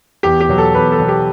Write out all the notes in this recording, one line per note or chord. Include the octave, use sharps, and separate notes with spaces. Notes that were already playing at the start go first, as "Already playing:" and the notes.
E2 G4
G4
B2 F#3
A4
E2 B4
A4
B2 F#3
G4